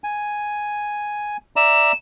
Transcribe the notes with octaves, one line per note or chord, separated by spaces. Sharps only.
G#5
D5 E5 A#5 E7